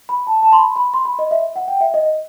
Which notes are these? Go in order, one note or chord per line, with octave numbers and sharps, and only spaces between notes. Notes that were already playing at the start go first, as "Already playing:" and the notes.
B5
A5
A5
C6
B5
B5
C6
B5
D#5
E5
F#5
G5
E5
D#5